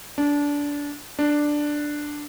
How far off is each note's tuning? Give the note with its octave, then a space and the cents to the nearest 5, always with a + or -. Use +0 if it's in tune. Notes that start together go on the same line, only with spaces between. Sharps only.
D4 -20
D4 +5